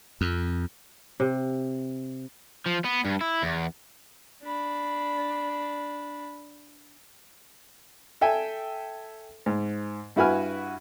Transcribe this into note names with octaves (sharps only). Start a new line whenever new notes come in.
F2
C3
F3
B3
G2
E4
E2
D4 B5
A4 E5 G5 G#5
G#2
G2 E4 F#4 B4 G#5 F6